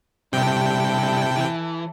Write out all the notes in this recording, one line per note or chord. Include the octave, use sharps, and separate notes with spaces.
G2 C3 E4 A4 G5
E3